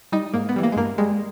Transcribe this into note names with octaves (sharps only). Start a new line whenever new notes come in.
G3 D#4
G#2 A#3
B3
E3 G3
A#3
G#3
G2 A#3
G3 G#3